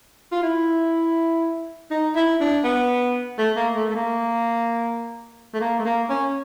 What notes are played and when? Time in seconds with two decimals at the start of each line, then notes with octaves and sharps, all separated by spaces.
0.32 F4
0.43 E4
1.91 D#4
2.15 E4
2.40 D4
2.64 B3
3.38 A3
3.57 A#3
3.75 A3
3.90 A3
3.95 A#3
5.54 A3
5.60 A#3
5.79 A3
5.85 A#3
6.09 C#4